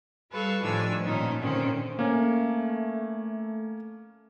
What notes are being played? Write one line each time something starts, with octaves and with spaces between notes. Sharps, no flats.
G3 A4 B4 F5 C#6
A2 D#3 F3 D4 G#5 E6
A#2 D#3 C#4 D#4
A#2 D3 D#3 C4 C#4
A3 A#3 C#4